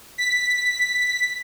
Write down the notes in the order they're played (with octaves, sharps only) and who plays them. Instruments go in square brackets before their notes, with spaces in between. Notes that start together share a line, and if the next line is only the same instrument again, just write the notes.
[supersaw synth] B6